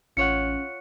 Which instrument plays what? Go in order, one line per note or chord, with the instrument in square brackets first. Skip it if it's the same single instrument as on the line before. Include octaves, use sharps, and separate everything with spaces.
[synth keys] A1 [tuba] C#4 [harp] F4 C#5 F#5 [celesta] C#7